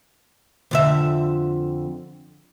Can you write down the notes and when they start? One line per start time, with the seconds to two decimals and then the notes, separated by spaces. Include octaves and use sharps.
0.71 F2 D3 E5